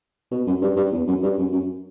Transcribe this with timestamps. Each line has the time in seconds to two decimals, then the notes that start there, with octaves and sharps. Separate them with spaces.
0.31 B2
0.47 F#2
0.62 G2
0.76 G2
0.92 E2
1.08 F#2
1.23 G2
1.38 F#2
1.52 F#2